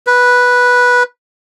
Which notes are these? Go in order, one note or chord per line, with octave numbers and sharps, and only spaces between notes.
B4